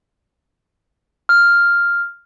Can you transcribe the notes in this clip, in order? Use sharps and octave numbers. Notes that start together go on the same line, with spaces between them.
F6